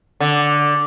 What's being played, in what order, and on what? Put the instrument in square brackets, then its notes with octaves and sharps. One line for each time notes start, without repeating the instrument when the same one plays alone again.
[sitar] D3